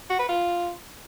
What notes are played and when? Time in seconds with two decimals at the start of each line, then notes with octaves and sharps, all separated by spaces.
0.09 F#4
0.19 B4
0.29 F4